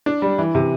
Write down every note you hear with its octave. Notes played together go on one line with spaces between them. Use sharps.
D4
G3
E3
C3